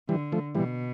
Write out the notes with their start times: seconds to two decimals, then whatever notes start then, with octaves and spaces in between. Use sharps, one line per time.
0.09 D3 E3 G3
0.32 F3 A3
0.55 B2 E3 G3